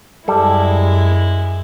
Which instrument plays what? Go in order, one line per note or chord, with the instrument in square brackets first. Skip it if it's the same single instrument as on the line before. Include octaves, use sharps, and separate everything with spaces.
[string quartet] F#2 G#3 E4 [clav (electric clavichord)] G3 A4